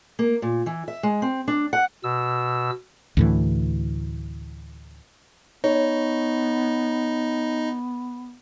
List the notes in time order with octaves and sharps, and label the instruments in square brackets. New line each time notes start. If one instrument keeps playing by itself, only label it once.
[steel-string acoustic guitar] A#3
A#2
E3
E5
G#3
C4
D4
F#5
[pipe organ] B2 E6
[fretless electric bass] D2 A2 E3
[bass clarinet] B3 [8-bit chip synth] D#4 [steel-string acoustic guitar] C#5